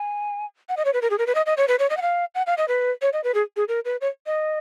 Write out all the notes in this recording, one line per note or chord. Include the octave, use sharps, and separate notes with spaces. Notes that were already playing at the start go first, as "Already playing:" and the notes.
Already playing: G#5
F#5
D#5
C#5
B4
A#4
G#4
A#4
B4
D#5
D#5
C#5
B4
C#5
D#5
F#5
F5
F#5
F5
D#5
B4
C#5
D#5
B4
G#4
G#4
A#4
B4
C#5
D#5